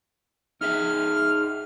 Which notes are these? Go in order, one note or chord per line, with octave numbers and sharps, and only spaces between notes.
D#4 G#4 E5 F6